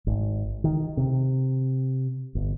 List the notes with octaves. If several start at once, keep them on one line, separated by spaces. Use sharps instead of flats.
G#1
D#3
C3
G1